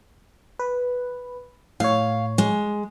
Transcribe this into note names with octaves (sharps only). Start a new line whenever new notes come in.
B4
A2 C#5 F5
G#3